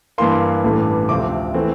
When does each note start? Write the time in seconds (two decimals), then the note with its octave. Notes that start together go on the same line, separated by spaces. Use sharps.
0.18 G2 E3 A#3 C6
0.64 A1 G2 E3 A3
1.09 D2 C3 F3 A3 C4 D6
1.54 E3 A3 C4